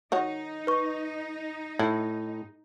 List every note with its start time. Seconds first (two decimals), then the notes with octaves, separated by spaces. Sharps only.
0.12 D#3 D#4 F#4 C#5
0.67 B4 C#6
1.79 A2 E4